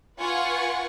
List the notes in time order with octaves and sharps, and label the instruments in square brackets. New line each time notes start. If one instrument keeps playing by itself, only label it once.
[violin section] F4 B4 F#5 G#5 C#6